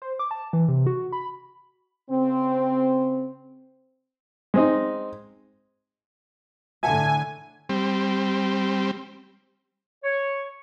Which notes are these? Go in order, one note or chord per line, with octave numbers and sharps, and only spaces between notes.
C5
D6
A5
E3
C3
F#4
B5
C#3 C4
G#3 C4 D#4
A2 D3 E5 F#5 G#5 A5
G3 C4
C#5